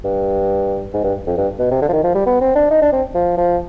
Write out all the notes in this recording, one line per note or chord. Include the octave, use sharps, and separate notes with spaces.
G2
G#2
G2
F2
G2
B2
C3
D3
F3
D#3
F3
G3
B3
C4
D4
D#4
D4
C4
F3
F3